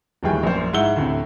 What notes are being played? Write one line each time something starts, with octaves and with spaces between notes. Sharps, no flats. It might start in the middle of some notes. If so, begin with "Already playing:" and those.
D1 D#2 E3 G3 G#4 G5
A#1 F#2 A#3 C5
G#2 E4 E5 F#5 E6 G7
D2 A2 C3